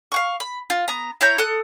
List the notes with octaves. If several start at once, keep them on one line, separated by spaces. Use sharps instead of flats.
F5 F#5 C#6
B5
F4
B3 A#5
E4 C#5 A#5 G6
A4 D#6 F#6